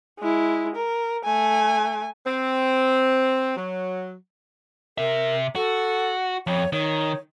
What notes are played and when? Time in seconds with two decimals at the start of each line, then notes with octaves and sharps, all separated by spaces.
0.19 G#3 E4
0.76 A#4
1.24 A3 G#5
2.26 C4
3.56 F#3
4.98 C3 A#4 E5
5.56 F#4 A4
6.47 F2 C#5
6.73 D#3 C#5